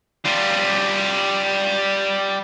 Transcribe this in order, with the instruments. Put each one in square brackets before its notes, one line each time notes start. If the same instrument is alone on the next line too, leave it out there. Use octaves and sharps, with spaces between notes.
[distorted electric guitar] G3 F4